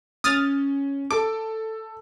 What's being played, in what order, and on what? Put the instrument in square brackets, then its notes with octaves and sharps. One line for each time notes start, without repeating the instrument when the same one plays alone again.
[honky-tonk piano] C#4 [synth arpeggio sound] D#6 F6 A6
[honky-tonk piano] A4 [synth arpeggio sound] D6